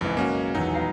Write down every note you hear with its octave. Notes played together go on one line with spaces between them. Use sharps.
F#1 B1 F2 E3 G#3
A#3 C#4 F#4
D#1 E2 F#3 D#4
B3 F5 A#5